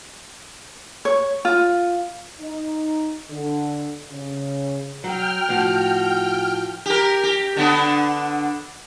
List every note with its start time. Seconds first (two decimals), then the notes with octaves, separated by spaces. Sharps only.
1.05 C#5
1.45 F4
2.41 D#4
3.31 D3
4.12 C#3
5.04 F#3 G5 F6
5.49 A2 F3 F#4
6.86 G4 A#4
7.23 G4
7.56 D3 B3 D4